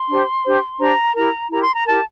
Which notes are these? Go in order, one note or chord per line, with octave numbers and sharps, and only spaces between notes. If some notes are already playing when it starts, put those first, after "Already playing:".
Already playing: C6
D4 G4 C5
D4 G4 C5
D4 G4 C5 A#5
E4 G4 A#4 A#5
E4 G4 A#4 A#5
C6
A#5
E4 G4 A#4 A5